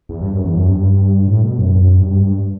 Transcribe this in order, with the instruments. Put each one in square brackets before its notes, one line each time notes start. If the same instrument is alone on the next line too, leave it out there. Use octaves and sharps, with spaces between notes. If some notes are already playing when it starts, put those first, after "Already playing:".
[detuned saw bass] E2
G2
F#2
E2
F#2
G2
A2
B2
F#2
F#2
G2
G2